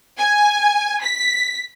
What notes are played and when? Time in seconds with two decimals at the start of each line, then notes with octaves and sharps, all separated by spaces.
0.20 G#5
1.04 B6